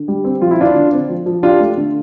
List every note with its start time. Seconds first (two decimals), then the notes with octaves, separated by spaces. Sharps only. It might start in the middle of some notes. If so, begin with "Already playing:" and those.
Already playing: D3
0.08 G3
0.24 C4
0.41 F3 F4
0.51 E4
0.58 D3 D4 F4
0.76 D3
0.92 C4
1.09 F3
1.26 F3
1.43 D4 F4 G4
1.60 A3
1.77 D3